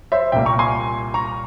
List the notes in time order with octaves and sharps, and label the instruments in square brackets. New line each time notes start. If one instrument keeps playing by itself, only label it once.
[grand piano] C5 E5
C2 A#2 G3 A#3 E5 G5
A#5 C#6
G#5 C6
A#5 C#6